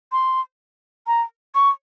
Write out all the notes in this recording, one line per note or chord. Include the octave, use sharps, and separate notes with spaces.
C6
A#5
C#6